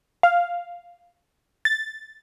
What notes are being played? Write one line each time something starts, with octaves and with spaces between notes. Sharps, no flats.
F5
A6